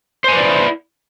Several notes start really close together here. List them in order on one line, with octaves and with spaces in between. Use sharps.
C5 G#5 B4 D5 E4